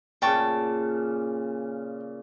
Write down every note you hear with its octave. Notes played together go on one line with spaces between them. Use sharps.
A#2 C#3 G5 A5 C#6